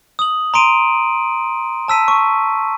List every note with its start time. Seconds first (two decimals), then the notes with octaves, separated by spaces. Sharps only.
0.19 D#6 F#7
0.54 A#5 C6 D7 D#7
1.88 A5 E6 B6 D#7
2.08 C#6